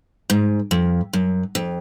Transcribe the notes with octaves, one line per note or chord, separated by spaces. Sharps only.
G#2
F2
F#2
F2